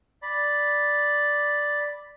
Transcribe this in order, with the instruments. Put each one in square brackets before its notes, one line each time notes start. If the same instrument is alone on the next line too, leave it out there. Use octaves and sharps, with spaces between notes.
[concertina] D5 B5